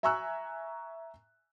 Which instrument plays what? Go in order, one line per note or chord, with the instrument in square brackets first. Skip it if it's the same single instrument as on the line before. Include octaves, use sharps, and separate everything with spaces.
[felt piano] E5 G#5 A#5 C#6 E6 F#6